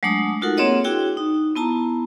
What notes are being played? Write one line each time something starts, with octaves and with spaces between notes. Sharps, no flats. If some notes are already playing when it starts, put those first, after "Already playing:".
F#3 G#3 A3 D4 D#6
D#4 F4 F#4 A4 A#4 F#5
A#3 C4 G#4 C#5 D#5 F#5
D4 E4 F#4 G#4 G5
D#4
B3 E4 A5 A#5